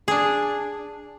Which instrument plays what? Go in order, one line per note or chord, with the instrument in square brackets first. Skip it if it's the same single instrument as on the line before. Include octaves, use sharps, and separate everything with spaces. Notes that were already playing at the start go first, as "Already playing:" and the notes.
[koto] D4 G#4